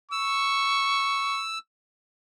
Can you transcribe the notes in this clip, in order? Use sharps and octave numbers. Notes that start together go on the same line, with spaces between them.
C#6 E6